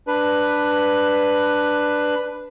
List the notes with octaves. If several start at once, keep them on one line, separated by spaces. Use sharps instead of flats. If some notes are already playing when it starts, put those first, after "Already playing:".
D4 B4